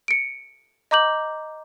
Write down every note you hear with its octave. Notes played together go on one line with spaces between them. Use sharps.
C#7 D7
D#5 A#5 D6 G6 F#7